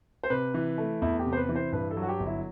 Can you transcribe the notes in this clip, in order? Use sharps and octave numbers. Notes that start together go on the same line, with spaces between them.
C5
C3 B4
E3
A3
E2 E4
G4
C3
C5
B4
E3
C5
G2 B4
A4
F#3
F#4
G4
G1
E4